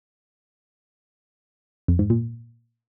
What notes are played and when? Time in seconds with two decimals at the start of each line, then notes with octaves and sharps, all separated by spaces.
1.88 F2
1.99 G#2
2.10 A#2